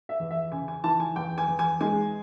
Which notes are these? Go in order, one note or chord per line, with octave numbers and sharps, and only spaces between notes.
E5
E2
E5
C#3 G#5
G#5
E3 A5
G#5
E2 G5
G#5
E2
G#5
G#3 G#5